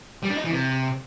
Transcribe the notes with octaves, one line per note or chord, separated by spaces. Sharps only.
G3
D4
D#4
E3
C3